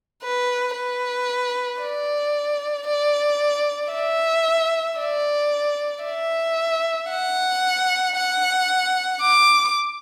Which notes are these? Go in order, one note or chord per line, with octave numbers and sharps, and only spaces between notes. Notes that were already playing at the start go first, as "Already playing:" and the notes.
B4
B4
D5
D5
E5
D5
E5
F#5
F#5
D6